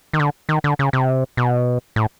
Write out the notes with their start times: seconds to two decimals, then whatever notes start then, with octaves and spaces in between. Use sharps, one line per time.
0.13 D#3
0.20 D3
0.49 D#3
0.64 D3
0.79 C#3
0.93 C3
1.37 B2
1.96 A2